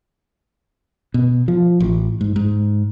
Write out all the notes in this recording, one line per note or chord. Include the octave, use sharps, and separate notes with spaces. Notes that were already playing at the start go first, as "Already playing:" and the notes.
B2
F3
A1
G#2
G#2